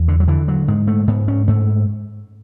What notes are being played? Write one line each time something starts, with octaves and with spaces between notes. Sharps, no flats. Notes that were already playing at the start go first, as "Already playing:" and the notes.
Already playing: E2
D3
F#3
D3 E3
F#3
G#2 G#3
A3
G#2 B3
C#4
G#2 A3